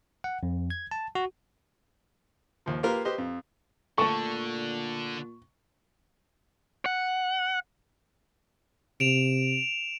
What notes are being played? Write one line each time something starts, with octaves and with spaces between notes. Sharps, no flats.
F#5
F2
G#6
A5
F#4
D#2 F3
A#3 F4 G4 A#4 B4
G4 B4 C5 D#5
F2
A#2 D3 A3 A4 C#6
F#5
C3 D7 E7 F7